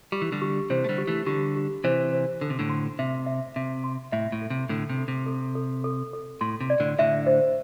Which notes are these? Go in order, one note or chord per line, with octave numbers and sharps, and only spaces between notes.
G3 G4
E3
D3 G3
G4
C3 E3 C5
A3
D3 G3
G4
E3 A3
D3 G3 G4
G4
C3 E3 C5
C5
D3 A4
C3
A2 D3
C6
C3 E5
E5
C3 E5
C6
A2 E5
A2
A4
C3
A2 D3 A4
C3
A4
C3
A4
A4
A4
A4
A2 C6
C3
D5
A2 D3
A2 D3 E5
C5